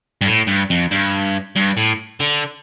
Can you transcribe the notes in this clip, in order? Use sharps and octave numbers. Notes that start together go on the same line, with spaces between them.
G2
A2
G2
F2
G2
G2
A2
D3